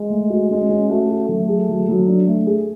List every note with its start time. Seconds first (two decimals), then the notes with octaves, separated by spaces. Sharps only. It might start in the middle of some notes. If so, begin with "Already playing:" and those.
Already playing: G#3
0.10 A3
0.30 F#4
0.50 G#3 C#4
0.70 C#4
0.90 A3 F#4
1.10 F#4
1.29 F#3 A3
1.49 G#4
1.69 F#3
1.89 F#3
2.07 D4
2.27 A3
2.47 G#4